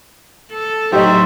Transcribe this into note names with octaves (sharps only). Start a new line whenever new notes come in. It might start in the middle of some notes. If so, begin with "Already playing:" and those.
A4
A2 F#3 D#4 G4 C5 D#5 E5